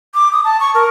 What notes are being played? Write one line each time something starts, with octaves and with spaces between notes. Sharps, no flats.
D6
D#6
A5
C#6
A#4